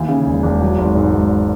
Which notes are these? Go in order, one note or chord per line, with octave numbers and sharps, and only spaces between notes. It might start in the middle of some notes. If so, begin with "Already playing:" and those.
Already playing: D#2 E3
C#3
E1
E1
F#3
G#1
G#2
G#1